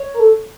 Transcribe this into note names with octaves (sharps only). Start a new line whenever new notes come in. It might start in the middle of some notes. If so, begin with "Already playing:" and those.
Already playing: C#5
A#4
A4